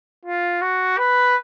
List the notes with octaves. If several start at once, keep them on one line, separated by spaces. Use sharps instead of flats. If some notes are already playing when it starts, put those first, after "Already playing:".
F4
F#4
B4